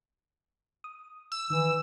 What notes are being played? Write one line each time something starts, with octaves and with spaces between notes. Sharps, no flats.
D#6
E6
D#3 E3